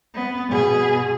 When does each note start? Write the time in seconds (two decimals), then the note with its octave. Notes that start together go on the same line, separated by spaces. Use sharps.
0.14 B3
0.49 B2 G#4